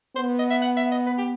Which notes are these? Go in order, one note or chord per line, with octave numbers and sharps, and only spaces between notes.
B3 C5
D#5
E5
F#5
E5
D#5
B4
G4